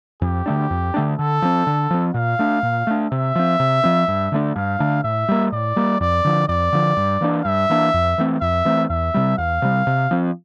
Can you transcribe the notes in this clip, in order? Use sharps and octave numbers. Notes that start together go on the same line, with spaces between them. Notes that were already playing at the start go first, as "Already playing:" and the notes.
F2 G4
D3 A3 D4
F2
D3 A3 D4
D3 A4
F3 C4
D3
F3 C4
A#2 F5
A3 D4
A#2
A3 D4
C3 E5
F3 C4
C3
F3 C4
G2
D3 A3 D4
G2 F5
D3 A3 D4
A2 E5
G3 A#3
A2 D5
G3 A#3
F2 D5
D3 F3
F2 D5
D3 F3
G2
E3 A#3 D4
G2 E5
E3 A#3 D4
F2
E3 A3 C4
F2 E5
E3 A3 C4
E2 E5
C3 G3
E2 F5
C3 G3
C3
F3 C4